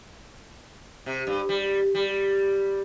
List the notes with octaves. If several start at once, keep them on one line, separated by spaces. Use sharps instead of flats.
C3
G2
G3
G3